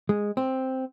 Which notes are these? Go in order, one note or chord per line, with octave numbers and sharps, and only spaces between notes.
G#3
C4